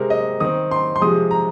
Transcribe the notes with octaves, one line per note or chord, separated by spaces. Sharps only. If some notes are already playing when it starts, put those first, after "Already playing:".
Already playing: C3 G#3 C4 A#4
D#5
D#3 C4 D#6
C6
C6
C3 F3 G#3 D#6
A#5